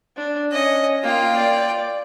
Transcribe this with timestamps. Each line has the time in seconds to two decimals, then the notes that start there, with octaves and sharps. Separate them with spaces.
0.17 D4
0.52 C#4 D#5
1.03 A#3 F4 G5
1.37 D5